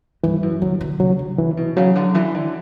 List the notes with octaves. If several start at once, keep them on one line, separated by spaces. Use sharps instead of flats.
G2 E3
F#2
D3 F#3
D3
C#3 F#3
D3
C#3 E3
B2
C#3 F#3
D3
E3
D3